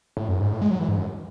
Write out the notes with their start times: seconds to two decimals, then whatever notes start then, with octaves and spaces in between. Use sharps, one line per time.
0.17 A2
0.28 F#2
0.41 G#2
0.52 A2
0.61 G#3
0.71 F#3
0.79 E3
0.89 G#2
0.97 F#2